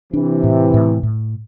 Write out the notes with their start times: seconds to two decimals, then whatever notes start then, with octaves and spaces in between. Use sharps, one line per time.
0.13 C3 E3 D4
0.44 A2
0.74 A2
1.03 A2